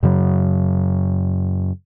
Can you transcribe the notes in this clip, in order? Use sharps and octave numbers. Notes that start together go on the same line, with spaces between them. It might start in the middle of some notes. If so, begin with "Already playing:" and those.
F#2 C#3 F#3